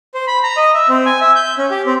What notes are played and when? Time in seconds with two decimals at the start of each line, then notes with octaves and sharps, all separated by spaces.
0.14 C5
0.27 B5
0.43 A#5
0.57 D#5
0.74 E5
0.89 C4
1.06 G#5
1.21 E5
1.36 G6
1.58 C#4
1.71 G4
1.86 C4